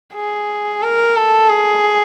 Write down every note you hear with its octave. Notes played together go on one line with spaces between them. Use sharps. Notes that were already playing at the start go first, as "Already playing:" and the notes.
G#4
A#4
A4
G#4